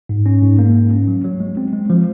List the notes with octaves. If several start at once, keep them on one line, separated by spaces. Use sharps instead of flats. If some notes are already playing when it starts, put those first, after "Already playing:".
G#2
C#4
G#2
A#3
G#2
C#4
F#3
F#3
G#3
C4
G#3
F3